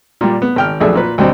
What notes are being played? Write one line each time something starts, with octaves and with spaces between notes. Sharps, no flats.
A#2 G3
B3
G#1 G5 F6
B1 F2 A3 D4 G#4 E5
A#2 B4
D2 B2 F#3 G3 C4